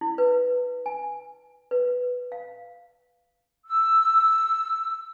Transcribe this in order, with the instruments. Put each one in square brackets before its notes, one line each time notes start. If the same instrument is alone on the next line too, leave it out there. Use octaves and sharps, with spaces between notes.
[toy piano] E4
B4
G#5
B4
F5
[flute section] E6